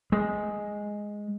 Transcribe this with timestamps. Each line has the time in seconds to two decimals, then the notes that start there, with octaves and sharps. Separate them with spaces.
0.12 G#3